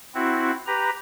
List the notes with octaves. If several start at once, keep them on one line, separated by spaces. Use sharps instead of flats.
C4 E4 F#4
G4 B4 A#5